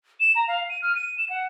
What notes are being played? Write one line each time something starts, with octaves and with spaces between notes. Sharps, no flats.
E7
A#5
F5
D#7
F6
D#7
E7
F#5